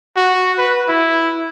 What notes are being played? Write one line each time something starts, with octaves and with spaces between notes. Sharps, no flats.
F#4
B4
E4